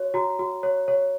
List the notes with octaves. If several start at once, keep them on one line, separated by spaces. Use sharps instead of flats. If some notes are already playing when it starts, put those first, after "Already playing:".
Already playing: F#4 C#5
F#4 A#5
F#4
C#5
C#5